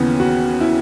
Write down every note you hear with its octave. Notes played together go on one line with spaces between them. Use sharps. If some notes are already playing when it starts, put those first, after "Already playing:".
Already playing: D#2 C#3 E3 B3
F#4
E4